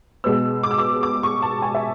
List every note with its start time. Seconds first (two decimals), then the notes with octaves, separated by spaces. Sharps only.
0.24 B2 G#3 B3 E6
0.63 D6
0.71 E6
0.78 D6
1.03 D6
1.23 C#6
1.42 A5
1.62 G#5
1.75 E5